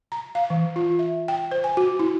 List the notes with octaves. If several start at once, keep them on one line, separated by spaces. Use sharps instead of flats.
A#5
F5
E3
F4
E5
G5
C5
G#5
F#4
E4